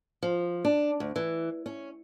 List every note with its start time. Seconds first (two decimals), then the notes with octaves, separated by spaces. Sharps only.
0.23 F3
0.65 D4
1.00 D2
1.16 E3
1.66 C#4